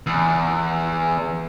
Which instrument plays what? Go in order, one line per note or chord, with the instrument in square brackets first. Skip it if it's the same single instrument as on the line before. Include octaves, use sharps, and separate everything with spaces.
[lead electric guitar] E2